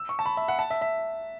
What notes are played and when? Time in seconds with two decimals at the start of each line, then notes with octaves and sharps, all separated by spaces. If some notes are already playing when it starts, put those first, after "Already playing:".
Already playing: E6
0.09 C#6
0.19 A5
0.26 B5
0.37 E5
0.48 F#5
0.59 A5
0.71 E5
0.82 E5